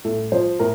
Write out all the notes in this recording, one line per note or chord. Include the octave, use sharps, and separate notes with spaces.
A2 A4
F3 C5
A2 A#4